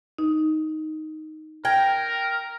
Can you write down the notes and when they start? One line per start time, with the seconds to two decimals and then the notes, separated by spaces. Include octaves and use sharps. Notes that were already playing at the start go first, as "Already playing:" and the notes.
0.18 D#4
1.65 A#4 G5 G#6